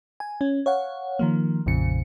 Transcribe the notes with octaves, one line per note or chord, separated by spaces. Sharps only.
G#5
C#4
C#5 F5 F#5
D#3 F3 A#3
A#1 F2 A#2 C#3 C#7